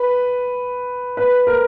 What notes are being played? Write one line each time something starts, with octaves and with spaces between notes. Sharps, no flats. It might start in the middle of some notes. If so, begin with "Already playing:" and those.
Already playing: B4
B4
A#4